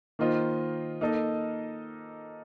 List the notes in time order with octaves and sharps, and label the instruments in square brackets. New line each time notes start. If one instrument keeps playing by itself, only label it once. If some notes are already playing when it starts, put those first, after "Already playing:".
[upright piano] D#3 A#3 F4 C5 D#5
A#3 D#4 A4 D#5